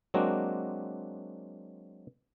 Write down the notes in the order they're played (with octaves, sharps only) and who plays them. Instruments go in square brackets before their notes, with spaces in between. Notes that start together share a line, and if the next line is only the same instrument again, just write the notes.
[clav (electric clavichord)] F#3 G#3 A#3 C4 D4 F#4